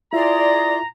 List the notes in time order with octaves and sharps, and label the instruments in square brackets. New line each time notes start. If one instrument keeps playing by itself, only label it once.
[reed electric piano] E4 F4 E5 [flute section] G#4 D5 C6 [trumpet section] A#5